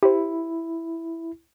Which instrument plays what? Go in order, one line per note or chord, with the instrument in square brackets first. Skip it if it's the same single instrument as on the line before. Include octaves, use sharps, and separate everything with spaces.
[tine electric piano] E4 [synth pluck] G4 C5